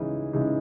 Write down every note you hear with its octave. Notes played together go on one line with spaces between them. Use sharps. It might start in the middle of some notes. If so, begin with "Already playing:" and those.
Already playing: C#3 E3 G#3 D#4
C#3 E3 G#3 D#4